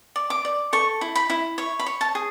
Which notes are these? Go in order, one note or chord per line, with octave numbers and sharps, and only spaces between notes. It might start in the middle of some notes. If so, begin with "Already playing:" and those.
D5
D6
D5
A4 C#6
E4
B5
E4
C#5
B5
C#5
A5
G#4